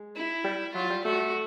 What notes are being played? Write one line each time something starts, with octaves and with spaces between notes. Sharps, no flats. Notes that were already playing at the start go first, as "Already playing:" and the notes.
Already playing: G#3
E4
G3
F#3 F4
G3
A3 F#4